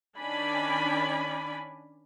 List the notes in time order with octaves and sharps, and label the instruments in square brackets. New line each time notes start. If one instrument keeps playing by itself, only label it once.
[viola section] D#3 C#4 D4 D5 G#5 B5